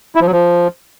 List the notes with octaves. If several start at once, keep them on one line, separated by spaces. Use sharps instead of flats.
E4
F3
F#3
F3